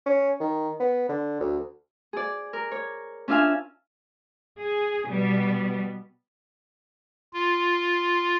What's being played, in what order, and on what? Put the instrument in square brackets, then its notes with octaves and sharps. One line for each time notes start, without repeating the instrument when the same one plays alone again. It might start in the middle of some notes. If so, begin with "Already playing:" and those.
[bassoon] C#4
D#3
B3
D3
D2
[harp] G#4 D5
A#4
C#5
C#4 D4 F4 E5 F5 G#5
[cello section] G#4
B2 G3 B3
[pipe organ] F4